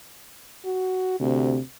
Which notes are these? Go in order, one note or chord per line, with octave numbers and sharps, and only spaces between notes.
F#4
D2 C3